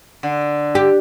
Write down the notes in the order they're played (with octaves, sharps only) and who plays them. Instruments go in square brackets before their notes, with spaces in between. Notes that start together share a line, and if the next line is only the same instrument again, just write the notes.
[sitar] D3
[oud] G4